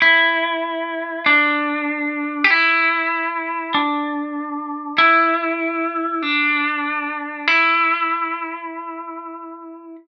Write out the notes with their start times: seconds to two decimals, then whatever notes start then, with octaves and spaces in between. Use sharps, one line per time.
0.02 E4
1.26 D4
2.44 G4
2.51 E4
3.75 D4
4.98 E4
6.22 D4
7.48 E4